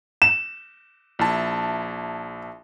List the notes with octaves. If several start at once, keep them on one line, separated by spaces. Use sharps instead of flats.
E7
A#1 E4 A5